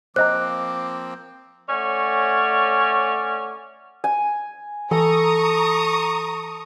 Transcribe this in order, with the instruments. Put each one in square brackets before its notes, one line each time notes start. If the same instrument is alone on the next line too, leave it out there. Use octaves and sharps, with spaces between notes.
[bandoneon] F3 A#3 C4 [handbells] C5 D#5 A#5 [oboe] D6 [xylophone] F#6
[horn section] A3 C#4 C#5 D5 F#5
[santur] G#5
[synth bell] E3 [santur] A4 [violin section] A#5 C#6 D#6